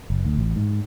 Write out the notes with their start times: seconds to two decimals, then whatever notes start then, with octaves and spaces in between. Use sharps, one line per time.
0.10 F#1
0.25 D2
0.37 A1
0.56 G#2